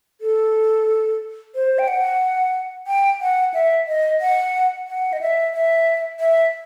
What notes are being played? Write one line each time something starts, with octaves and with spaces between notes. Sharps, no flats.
A4
C5
G5
F#5
G5
F#5
E5
D#5
F#5
F#5
D#5
E5
E5
E5